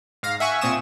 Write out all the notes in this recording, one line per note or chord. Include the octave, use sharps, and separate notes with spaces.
G#2 F5 A#6
E5 F#5 G#5 C#6
A#2 C4 G#5 C#6 D#6 E7